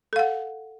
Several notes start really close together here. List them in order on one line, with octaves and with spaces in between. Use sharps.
A4 F5 F#5